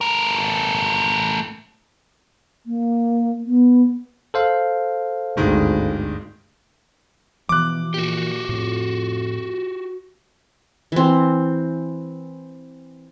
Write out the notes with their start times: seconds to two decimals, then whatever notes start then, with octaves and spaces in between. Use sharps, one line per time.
0.01 A3 A#4
2.66 A#3
3.46 B3
4.34 A4 C5 F5
5.37 G#1 D2 G2 D#3 G#3
7.49 B2 E3 F3 D6 F#6
7.94 A#2 F#4 G4
8.49 F2 A2
10.92 E3 C4